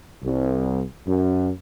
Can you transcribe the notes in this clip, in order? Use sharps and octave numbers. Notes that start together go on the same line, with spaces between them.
C2
F#2